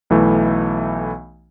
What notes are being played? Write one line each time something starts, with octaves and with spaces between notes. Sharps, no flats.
B1 E3 A3